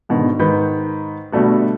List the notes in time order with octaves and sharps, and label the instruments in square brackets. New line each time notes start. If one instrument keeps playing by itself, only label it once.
[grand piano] G#2 B2 D3 D#3
G#2 D#3 B4 B5 G6
B2 D3 G3 A3 F#4